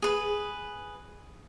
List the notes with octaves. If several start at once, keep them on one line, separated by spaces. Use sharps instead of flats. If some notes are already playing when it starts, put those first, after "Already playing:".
G#4 B4